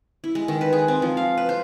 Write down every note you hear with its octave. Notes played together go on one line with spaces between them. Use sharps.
E4
G#3
D#3
B4
G#4
C4
F3
F5
B4
C5